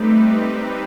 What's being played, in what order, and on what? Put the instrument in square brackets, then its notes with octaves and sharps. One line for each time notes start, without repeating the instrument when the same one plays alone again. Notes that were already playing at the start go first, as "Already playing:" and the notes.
Already playing: [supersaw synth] G3 C4 D#4 G4 B4 [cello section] A3